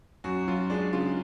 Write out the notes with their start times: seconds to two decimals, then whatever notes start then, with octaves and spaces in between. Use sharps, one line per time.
0.24 F#2 F#4
0.47 F#2 F4
0.70 G#3 D4
0.93 C#3 F4